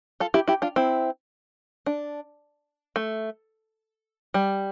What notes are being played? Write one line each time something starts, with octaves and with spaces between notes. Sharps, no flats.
F4 A4
E4 G4
E4 G4
D4 F4
C4 E4
D4
A3
G3